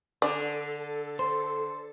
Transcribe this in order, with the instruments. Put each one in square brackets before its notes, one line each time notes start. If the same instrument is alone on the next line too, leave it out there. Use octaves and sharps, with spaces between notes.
[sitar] D3 [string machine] A4 [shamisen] D5
[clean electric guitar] C5